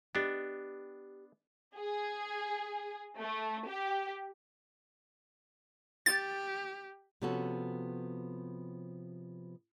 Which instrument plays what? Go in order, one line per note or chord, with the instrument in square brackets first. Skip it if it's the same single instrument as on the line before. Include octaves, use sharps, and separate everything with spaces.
[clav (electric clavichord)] B3 D4 [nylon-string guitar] G4 D#5
[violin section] G#4
A3
G4
[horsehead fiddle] G4 [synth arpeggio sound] A6
[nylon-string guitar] C3 F3 B3 C#4 F#4 A4